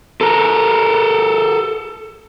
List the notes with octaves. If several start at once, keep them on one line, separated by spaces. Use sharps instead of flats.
A4 A#4